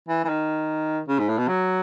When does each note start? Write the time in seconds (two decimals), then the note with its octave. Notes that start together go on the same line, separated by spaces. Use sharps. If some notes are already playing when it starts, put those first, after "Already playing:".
0.09 E3
0.25 E3
0.29 D#3
1.08 C#3
1.19 G#2
1.29 A2
1.38 B2
1.48 F#3